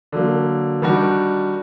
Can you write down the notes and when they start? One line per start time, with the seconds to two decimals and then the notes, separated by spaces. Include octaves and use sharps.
0.12 D3 F#3 A#3
0.82 D#3 G3 D4 F#4